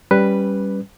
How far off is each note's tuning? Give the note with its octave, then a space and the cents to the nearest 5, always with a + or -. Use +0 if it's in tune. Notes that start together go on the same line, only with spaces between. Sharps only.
G3 +0 C#4 +0 B4 +0